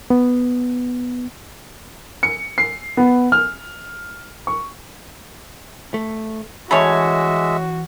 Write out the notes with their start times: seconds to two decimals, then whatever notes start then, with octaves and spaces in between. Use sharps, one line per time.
0.10 B3
2.23 C#7
2.58 C7
2.97 B3
3.32 F6
4.47 C#6
5.94 A3
6.71 E3 G#3 A3 C#4 F#4 C#5 E5 B5